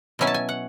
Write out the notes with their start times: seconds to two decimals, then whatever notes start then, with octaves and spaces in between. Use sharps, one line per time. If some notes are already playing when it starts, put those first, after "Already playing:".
0.19 B2 F#3 C#4 E4 G#5
0.27 A5
0.34 G#5
0.49 F#5